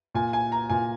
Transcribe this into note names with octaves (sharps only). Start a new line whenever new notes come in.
A#2 G#5
G#5
A#5
A#2 G#5